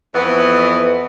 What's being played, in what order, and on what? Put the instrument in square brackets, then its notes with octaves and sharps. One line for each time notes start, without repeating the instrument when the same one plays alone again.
[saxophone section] F2 E3 B3